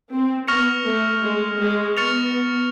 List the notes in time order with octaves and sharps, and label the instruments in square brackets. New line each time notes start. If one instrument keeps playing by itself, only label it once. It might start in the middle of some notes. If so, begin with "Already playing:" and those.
[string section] C4
[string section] B3 [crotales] C#6 F6 A#6 C#7 F7
[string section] A3
G#3
G#3
[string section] B3 [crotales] C#6 F6 A6 C#7 F7